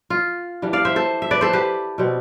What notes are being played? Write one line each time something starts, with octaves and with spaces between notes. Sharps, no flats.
F4
E3 G3 D4
D5 F5
C5 E5
A4 C5
E5
B4 D5
A4 C5
G4 B4
B2 G3 C4